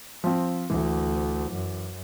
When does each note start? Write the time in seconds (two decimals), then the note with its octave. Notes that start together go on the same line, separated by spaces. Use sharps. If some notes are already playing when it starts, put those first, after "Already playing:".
0.24 F3 C4
0.70 D2 E3
1.52 F#2